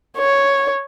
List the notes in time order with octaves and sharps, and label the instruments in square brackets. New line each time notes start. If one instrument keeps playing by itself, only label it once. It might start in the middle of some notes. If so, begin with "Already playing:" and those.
[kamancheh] C#5